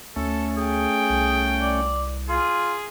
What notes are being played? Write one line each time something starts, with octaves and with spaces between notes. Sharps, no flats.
D2 A3 C#4 A4
G#4 G5
C2
D5
F4 G#4